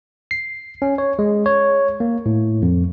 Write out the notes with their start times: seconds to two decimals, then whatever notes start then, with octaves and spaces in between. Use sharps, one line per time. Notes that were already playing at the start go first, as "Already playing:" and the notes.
0.31 C7
0.82 C#4
0.98 C#5
1.19 G#3
1.46 C#5
2.00 A#3
2.26 A2
2.62 F2